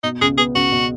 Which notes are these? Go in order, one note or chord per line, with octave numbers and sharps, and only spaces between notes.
B2 D#4
C#2 G#4
B3 G#4
C#2 F#4
B2